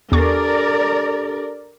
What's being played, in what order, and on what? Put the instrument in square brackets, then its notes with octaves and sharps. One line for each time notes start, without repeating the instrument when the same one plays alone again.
[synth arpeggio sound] E2 C#6 [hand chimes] D4 G4 A4 [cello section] A#4 D5